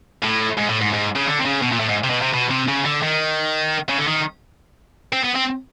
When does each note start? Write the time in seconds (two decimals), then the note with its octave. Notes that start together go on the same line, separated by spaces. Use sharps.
0.23 A2
0.57 G#2
0.69 A2
0.81 G#2
0.93 G#2
1.16 C#3
1.27 D3
1.39 C3
1.46 C#3
1.62 B2
1.72 A#2
1.80 A2
1.89 G#2
2.04 C3
2.10 B2
2.22 C3
2.33 B2
2.50 C3
2.68 C#3
2.86 D3
3.03 D#3
3.89 C#3
3.99 D3
4.08 D#3
5.13 C4
5.24 B3
5.35 C4